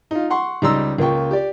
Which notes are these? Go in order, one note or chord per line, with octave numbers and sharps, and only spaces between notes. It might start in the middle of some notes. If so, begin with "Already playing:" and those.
D#4 F4
F#5 C6 C#6
C#2 G3 D#4 A#5 C6 E6
C#2 A#3 F4 G5 C#6
G4 D5